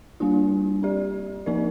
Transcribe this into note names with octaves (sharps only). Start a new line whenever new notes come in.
G3 A#3 D4 F4
C4 G4 D5
F3 A#3 D#4 A#4 D5